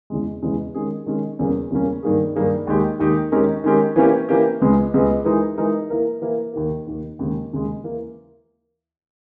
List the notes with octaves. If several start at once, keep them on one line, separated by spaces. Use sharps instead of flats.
E2 C#3 E3 G#3
E2 C#3 E3 G#3
D#3 G#3 C#4 G#4
D#3 G#3 C#4 G#4
E2 C#3 G3 A#3 C#4
E2 C#3 G3 A#3 C#4
G2 D#3 A#3 D#4 G#4
G2 D#3 A#3 D#4 G#4
D#2 D#3 G#3 D#4 G4
D#2 D#3 G#3 D#4 G4
D#3 G#3 C#4 G4 A#4
D#3 G#3 C#4 G4 A#4
E3 A#3 C#4 G4
E3 A#3 C#4 G4
C#2 C#3 G#3 B3
C#2 C#3 G#3 B3
E3 G#3 D#4 A#4
E3 G#3 D#4 A#4
E3 A#3 E4 A#4
E3 A#3 E4 A#4
D#2 D#3 A#3
D#2 D#3 A#3
D#2 C#3 G#3
D#2 C#3 G#3
E3 A#3 E4